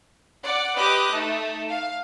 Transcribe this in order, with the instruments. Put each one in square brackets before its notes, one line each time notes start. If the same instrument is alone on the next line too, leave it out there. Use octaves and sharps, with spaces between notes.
[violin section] D5 F#5 D6
G4 B4 D#5 D6 F#6
A3 D#4
F5